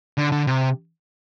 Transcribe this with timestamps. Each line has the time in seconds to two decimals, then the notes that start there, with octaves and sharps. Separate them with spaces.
0.18 D3
0.32 D3
0.47 C3